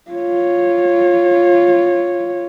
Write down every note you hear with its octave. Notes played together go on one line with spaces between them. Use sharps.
F4 C#5